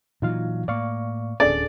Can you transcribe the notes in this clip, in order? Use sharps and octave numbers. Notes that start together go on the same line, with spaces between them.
A#2 E3 F#3 D#4 F4 F5
A2 A#3 D5 F5 C#6
D1 C#4 D4 G#4 A4 D5